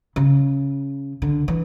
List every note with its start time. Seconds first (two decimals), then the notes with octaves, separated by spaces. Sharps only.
0.16 C#3
1.22 D3
1.48 E3